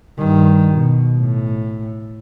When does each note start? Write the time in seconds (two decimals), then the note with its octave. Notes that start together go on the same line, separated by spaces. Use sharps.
0.18 G2 D#3
0.74 B2
1.21 A2